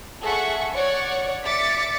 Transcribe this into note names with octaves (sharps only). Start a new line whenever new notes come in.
G#4 A4 E5 F#5 C#6
C#5 D5 F#5 C#6
D5 E5 D6 A6 B6 C#7